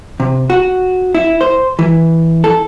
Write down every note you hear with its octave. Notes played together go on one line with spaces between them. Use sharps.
C3
F#4
E4
C5
E3
A4